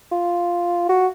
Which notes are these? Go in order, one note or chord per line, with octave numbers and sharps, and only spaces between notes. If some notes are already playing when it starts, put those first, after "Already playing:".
F4
F#4